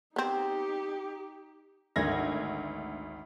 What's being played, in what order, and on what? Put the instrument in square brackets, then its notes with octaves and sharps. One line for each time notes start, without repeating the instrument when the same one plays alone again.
[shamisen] B3 C4 [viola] D#4 G4
[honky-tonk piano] G#1 D2 G#6 A#6